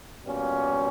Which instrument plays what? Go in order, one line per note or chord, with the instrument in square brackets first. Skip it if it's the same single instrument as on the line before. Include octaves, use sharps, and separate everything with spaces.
[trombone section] B2 G3 A#3 C#4 F4